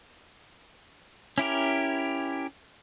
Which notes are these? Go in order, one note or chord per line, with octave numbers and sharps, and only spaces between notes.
C#4 E4 G4 A#4